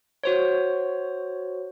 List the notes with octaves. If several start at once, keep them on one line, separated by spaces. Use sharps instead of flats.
F#4 C5 C#5